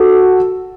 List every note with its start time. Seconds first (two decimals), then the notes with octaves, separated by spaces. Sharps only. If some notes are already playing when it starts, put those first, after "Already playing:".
Already playing: F#4 A4